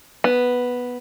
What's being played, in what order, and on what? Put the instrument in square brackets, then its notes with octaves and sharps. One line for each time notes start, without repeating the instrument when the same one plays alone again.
[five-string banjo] B3